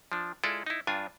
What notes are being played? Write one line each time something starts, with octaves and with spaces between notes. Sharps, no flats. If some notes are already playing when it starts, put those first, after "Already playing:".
F3 D4
G#3 E4 F4 A4 D5
D#4 E4
G2 D4 F4 G#5